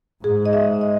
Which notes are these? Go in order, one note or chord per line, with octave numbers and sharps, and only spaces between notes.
G#2 G#4
D#5
E5
D#5